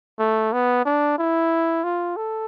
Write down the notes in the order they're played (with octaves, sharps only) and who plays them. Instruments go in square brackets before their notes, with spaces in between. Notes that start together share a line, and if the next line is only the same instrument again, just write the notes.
[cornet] A3
B3
D4
E4
F4
A4